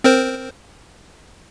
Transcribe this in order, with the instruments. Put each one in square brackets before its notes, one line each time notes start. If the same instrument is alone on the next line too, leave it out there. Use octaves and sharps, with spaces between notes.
[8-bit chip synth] C4 A#4 C5